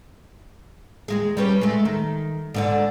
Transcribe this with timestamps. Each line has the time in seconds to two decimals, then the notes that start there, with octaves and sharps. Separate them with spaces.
1.08 D#2 G#3 G#4
1.37 G3 C#4 B4
1.61 G#3 A3
1.85 D#3
2.54 G#2 D3 D4